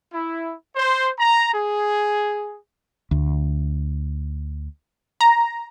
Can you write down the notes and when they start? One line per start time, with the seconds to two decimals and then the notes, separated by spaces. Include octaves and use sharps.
0.13 E4
0.76 C5
1.19 A#5
1.53 G#4
3.11 D2
5.21 A#5